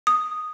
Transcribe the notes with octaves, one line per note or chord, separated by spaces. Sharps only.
D#6